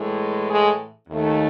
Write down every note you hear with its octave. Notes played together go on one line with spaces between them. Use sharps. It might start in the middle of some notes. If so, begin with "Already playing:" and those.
Already playing: A2 E3 G#3
G#3 G#4
D#2 D#3 A3